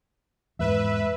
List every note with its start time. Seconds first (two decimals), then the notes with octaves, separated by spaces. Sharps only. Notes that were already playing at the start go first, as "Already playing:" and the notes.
0.59 E2 G#2 B4 E5